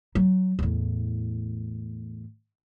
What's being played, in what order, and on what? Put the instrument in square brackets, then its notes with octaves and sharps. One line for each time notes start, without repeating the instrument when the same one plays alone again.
[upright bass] F#3
E2 A2